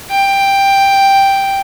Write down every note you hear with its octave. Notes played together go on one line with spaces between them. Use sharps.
G5